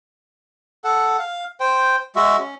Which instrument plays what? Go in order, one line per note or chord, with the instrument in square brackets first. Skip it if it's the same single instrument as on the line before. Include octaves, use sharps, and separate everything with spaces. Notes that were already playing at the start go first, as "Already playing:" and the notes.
[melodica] A4 F#5
F5
C5 G5
G#3 F#4 E5
C#4